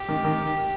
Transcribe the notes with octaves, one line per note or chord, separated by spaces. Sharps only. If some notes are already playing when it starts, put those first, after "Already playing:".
Already playing: G4
D#3
D#3